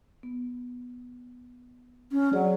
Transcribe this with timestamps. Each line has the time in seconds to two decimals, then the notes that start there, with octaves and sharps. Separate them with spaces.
0.23 B3
2.12 C#4
2.33 F#3 G#4 C#5 D5